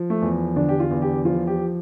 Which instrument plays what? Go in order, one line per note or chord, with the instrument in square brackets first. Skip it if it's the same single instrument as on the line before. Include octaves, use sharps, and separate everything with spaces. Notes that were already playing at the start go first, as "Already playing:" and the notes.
Already playing: [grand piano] F3
A3
E2
D3 D4
G4
F4
E2
G4
F3 F4
G4